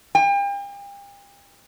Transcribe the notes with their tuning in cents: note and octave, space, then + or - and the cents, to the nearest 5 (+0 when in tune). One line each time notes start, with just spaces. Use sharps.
G5 +40